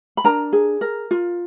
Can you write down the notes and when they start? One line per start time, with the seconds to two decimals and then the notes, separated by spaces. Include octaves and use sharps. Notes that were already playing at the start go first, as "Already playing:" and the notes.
0.17 B5
0.24 D4 A#4 A#5
0.53 G#4
0.81 A#4
1.11 F4